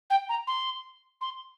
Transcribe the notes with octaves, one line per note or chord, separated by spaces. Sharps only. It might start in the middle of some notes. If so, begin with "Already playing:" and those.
G5
A#5
C6
C6